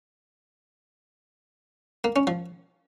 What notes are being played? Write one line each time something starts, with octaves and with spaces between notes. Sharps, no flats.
A#3
C#4
F3